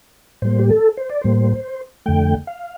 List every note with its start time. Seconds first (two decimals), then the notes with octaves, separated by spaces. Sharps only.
0.42 A2 G3 A#3 C5
0.59 G4
0.70 A4
0.97 C5
1.10 D5
1.21 A2 G3 A#3 C5
2.06 F2 D3 A3 G5
2.47 F5